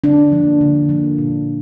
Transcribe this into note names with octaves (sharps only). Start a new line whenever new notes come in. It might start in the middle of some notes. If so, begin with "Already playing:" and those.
D3 D4
F3 A#3
D3
F3 A#3
A#2